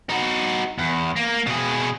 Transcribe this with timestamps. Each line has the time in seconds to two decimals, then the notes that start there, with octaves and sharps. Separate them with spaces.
0.10 D#4 F#4
0.78 E2
1.16 A#3
1.47 B2 G#4